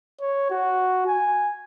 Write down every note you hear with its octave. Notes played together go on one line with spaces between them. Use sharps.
C#5
F#4
G#5